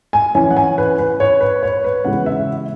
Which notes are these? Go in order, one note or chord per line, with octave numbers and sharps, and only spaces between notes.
G#5
E3 C#4 E4 G#5
F#5
G#5
B4
B4
C#5
B4
C#5
B4
C#3 E3 G#3 B3 F#5
E5